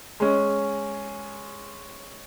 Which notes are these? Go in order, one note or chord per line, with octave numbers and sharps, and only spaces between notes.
G#3 C#4